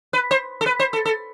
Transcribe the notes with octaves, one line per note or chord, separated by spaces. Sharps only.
B4
C5
A4
B4
C5
A4
A4